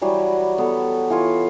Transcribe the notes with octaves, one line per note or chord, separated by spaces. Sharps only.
E3 F#3 G3 F#4
B3 A4
E3 F4 C#5